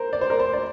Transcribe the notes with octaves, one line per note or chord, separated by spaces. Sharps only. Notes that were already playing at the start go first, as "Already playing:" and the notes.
Already playing: A#4 C5
D5
C5
A#4
C5
D5